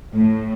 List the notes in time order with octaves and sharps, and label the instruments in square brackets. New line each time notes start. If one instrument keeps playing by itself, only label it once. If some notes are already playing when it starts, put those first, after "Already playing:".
[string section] A2